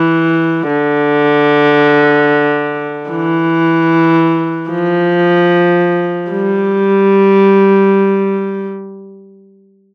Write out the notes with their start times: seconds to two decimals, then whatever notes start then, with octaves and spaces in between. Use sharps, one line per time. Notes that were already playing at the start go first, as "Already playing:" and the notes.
Already playing: E3
0.68 D3
3.10 E3
4.70 F3
6.31 G3